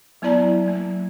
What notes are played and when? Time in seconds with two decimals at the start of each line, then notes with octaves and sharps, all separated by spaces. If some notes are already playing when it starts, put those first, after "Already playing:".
0.22 F#3 B3 E4 D5 A5 A#5
0.65 F#3 A#3